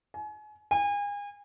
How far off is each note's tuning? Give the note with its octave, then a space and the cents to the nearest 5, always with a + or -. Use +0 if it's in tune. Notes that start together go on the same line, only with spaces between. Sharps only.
G#5 +35
G#5 -35